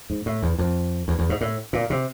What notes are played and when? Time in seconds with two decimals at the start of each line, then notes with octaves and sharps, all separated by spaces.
0.10 G#2
0.26 A2
0.43 E2
0.59 F2
1.08 E2
1.19 E2
1.29 G#2
1.41 A2
1.73 A#2
1.90 C3